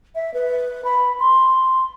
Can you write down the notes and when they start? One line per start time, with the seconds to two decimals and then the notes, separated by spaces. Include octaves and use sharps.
0.15 E5
0.34 B4
0.85 B5
1.20 C6